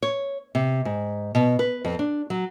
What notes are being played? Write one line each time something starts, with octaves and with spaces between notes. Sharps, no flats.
C#5
C3
G#2
B2
B4
F2
D4
F#3